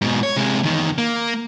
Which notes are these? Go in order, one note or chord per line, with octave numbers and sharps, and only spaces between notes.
G#2 B2
C#5
C3 G#3
E2 D#3
A#3